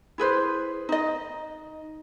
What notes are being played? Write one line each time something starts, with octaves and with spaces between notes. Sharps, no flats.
E4 G#4 B4 C5
D#4 D#5